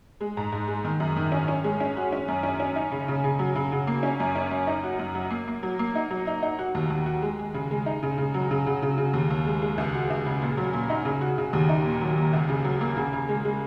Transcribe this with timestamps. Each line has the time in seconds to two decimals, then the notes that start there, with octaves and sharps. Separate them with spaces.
0.21 G#3
0.37 G#2
0.52 G#2
0.68 G#3
0.84 D#3
1.00 F#2
1.16 D#3
1.32 C#4
1.48 C#4
1.64 G#3
1.80 C#4
1.97 F#4
2.12 C#4
2.28 F#2
2.43 C#4
2.60 C#4
2.76 D#4
2.91 C#3
3.08 C#3
3.24 C#3
3.39 F#3
3.55 C#3
3.72 C#3
3.87 A#3
4.03 C#4
4.20 F#2
4.36 C#4
4.51 F#2
4.67 D#4
4.84 F#4
4.99 F#2
5.15 F#3
5.31 A#3
5.48 A#3
5.63 F#3
5.79 A#3
5.95 D#4
6.11 F#3
6.27 D#4
6.43 D#4
6.59 F#4
6.75 D#2
6.90 D#2
7.06 F#4
7.22 G#3
7.39 G#3
7.54 C#3
7.71 G#3
7.86 D#4
8.03 C#3
8.18 C#3
8.34 F#3
8.51 C#3
8.66 C#3
8.82 C#3
8.98 C#3
9.14 D#2
9.30 D#2
9.47 G#3
9.62 G#3
9.78 C#2
9.94 F#4
10.10 C#2
10.26 C#3
10.42 A#2
10.57 F#3
10.73 A#2
10.90 D#4
11.05 C#3
11.21 F#4
11.38 C#3
11.53 D#2
11.69 D#4
11.85 A#2
12.01 F#3
12.17 A#2
12.33 C#2
12.49 C#3
12.65 F#3
12.81 A#3
12.97 C#3
13.13 C#3
13.29 G#3
13.45 G#3